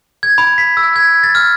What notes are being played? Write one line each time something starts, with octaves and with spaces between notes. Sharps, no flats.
G#6
B5
B6
E6
G#6
A6
F6